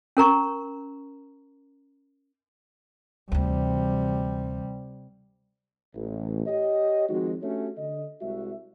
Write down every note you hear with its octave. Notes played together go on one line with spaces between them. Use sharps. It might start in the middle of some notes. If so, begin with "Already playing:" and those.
C#4 A#4 A#5 C#6
D2 C3 E3 G3
A1
G4 C#5 D#5
D#3 F3 G#3 C4 D#4 F#4
A3 C#4 D4 F#4 G4 C#5
D3 D#5
C2 G#3 F#4 E5